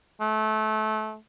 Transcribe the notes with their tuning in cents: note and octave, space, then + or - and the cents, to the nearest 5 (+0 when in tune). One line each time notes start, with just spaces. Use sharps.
A3 -25